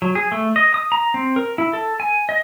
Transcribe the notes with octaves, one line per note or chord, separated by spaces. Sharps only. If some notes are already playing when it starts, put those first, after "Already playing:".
F#3
G#4
A3
D#5
D#6
A#5
C4
A#4
E4
A4
G#5
D#5